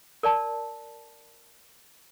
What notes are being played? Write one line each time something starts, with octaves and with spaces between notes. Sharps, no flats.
A#4 D5 A5